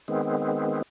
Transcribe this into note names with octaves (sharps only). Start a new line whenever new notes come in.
D#3 G#3 B3 C4